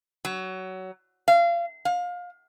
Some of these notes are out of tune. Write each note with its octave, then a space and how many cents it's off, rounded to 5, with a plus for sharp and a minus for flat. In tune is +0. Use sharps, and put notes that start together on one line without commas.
F#3 +20
F5 -30
F5 +30